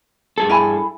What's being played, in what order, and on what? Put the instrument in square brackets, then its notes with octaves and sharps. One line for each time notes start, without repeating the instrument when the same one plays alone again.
[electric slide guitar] G2 G#4 A4
[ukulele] E4 G#5 B5